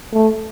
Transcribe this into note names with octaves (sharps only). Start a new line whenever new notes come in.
A3